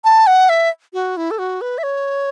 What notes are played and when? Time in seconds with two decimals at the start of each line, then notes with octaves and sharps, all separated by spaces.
0.04 A5
0.27 F#5
0.49 E5
0.93 F#4
1.17 E4
1.31 A4
1.38 F#4
1.61 B4
1.78 E5
1.83 C#5